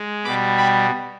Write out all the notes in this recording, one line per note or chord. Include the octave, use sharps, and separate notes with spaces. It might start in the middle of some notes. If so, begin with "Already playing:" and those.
Already playing: G#3
B2 G3 B5 D6
G5 B5